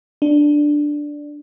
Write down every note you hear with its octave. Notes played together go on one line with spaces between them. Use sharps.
D4